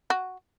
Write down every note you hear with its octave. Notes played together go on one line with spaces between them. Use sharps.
F#4